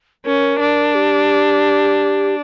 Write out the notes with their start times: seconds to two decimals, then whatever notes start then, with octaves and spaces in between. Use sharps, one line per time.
0.25 C#4 A#4
0.60 D4
0.95 G4